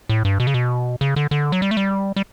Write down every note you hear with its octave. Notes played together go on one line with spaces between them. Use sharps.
A2
G2
B2
C#3
B2
C#3
D3
D3
F#3
G3
A3
G3
G3